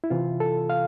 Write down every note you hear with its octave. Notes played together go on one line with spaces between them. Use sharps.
E4
C3 E3 F4
A4
F5